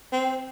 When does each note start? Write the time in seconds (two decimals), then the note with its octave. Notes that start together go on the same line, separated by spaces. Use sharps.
0.12 C4